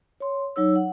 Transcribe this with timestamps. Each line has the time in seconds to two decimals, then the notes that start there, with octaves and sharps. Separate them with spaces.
0.20 C#5 C6
0.56 F#3 D#4 C#5 E6
0.76 F#5